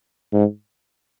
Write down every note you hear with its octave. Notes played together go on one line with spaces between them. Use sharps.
G#2